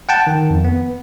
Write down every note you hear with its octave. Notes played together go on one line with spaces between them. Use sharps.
F#5 G5 A5
D#3
F2
B3